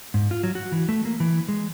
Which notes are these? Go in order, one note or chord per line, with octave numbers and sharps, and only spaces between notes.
G#2
F4
F#3
F#4
E3
A3
A#3
E3
G#3